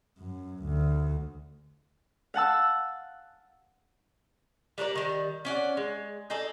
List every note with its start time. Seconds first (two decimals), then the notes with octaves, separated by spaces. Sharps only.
0.19 F#2
0.64 D2
2.34 F5 F#5 A5 E6
4.78 G3 D4 A#4 D5
4.96 D#3 G3
5.45 C#4 D5 F#5
5.77 G#3
6.30 D#4 G#4 A4 D5